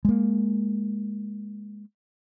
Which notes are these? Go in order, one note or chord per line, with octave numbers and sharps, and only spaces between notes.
G#3 A#3